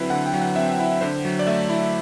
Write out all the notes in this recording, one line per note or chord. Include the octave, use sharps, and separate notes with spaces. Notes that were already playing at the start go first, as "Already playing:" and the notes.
Already playing: D3 F#3 C4 E4 B4
D3 F#5
G5
F#3
F#5
C4 E5
E4
D3 C5
F#3
D5
A3 E5
E4